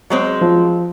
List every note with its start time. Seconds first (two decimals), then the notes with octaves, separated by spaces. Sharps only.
0.10 F#3 G#3 C4
0.41 F3